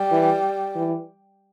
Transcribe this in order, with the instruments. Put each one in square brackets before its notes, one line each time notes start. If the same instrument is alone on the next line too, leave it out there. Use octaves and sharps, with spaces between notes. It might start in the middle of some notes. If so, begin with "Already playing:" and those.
Already playing: [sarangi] G3
[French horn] E3
E3